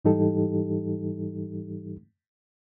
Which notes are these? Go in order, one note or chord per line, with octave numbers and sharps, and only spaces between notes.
G#2 E3 G3 D#4 G4 A4